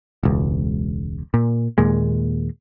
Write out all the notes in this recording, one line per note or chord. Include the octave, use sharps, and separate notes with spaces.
E1 C#2
A#2
D#2 A#2 G#3